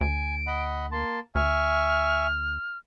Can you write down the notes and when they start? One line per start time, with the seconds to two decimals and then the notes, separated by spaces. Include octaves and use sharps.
0.01 D2 G#5 D7
0.47 D#5 F#5 B5
0.92 A#3 A5 C6
1.35 D2 E5 G#5 C#6 F6